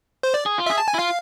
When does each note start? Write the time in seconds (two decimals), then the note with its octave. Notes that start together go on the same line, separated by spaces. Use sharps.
0.23 C5
0.34 D5
0.46 G#4
0.58 F4
0.66 G#4 E5
0.78 A5
0.88 G#5
0.94 E4
0.99 F4 F5